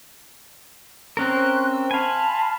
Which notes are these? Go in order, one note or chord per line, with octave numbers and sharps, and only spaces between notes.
C4 C#4 A#4 F#6
E6
F5 G#5 A5 B5 C6